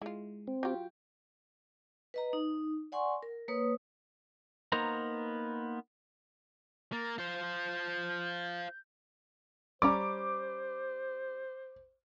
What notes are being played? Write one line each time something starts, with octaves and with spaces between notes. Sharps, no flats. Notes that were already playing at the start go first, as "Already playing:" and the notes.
G#3 E4 F4
C4
F#3 F4 G4 G5
B4 D#5 A#5
D#4
D5 F#5 G#5 C6 C#6
A#4
A#3 B4 C#5 D#6
A#3 B3 D#4 A#4 C5 A#5
A#3 A6
F4 C5 G6
G3 C#4 C5 A#5 D6